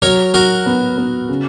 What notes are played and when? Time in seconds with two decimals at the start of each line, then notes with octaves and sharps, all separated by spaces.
0.02 F#3 A#4 C#5
0.34 F#3 F#4 A#4
0.66 B3
0.98 B3
1.29 C#3